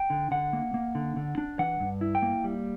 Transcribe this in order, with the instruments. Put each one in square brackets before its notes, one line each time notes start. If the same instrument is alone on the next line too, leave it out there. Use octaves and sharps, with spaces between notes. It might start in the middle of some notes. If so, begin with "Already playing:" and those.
Already playing: [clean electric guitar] G5
D3
D3 F#5
A#3
A#3
D3
D3
D4
E3 F#5
G2
E4
G5
A#3
G3